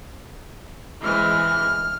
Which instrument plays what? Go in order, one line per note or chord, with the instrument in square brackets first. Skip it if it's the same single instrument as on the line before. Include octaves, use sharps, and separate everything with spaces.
[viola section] E3 G#3 C4 [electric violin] F6